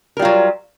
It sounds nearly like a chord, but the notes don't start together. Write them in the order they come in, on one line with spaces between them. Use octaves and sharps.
A#4 G3 F4 F#3